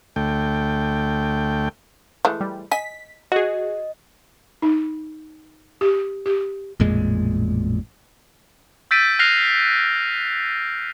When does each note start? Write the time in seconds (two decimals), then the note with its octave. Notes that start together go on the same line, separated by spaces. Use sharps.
0.16 D2 A3 G5
2.25 E3 G#3 A3
2.41 G3
2.71 D#5 G#5 B6
3.32 F#4 G#4 D#5 F#5
4.62 D#4
5.81 G4
6.26 G4
6.80 A1 F2 A#2 G#3
8.91 E6 G6 A6 B6 D7 D#7
9.19 F6 F#6 A#6 C7 F7